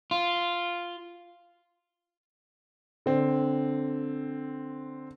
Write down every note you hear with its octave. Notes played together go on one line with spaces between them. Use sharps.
F4
D3 C4